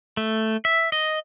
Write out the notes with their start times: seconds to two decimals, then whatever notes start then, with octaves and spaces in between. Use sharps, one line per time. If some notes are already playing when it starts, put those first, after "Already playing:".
0.17 A3
0.65 E5
0.92 D#5